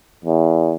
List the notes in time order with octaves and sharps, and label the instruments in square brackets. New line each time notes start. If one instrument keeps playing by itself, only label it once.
[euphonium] E2